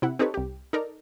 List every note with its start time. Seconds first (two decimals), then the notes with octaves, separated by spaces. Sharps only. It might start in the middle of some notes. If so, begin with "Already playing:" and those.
0.02 C3 E4 F#5
0.19 C4 D#4 G4 A4 B4 C#5
0.34 C2 G4
0.73 D#4 A4 A#4 D5 A#5